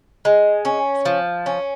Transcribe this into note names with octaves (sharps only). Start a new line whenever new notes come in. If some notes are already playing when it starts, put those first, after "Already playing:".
G#3
C#4
F3
C#4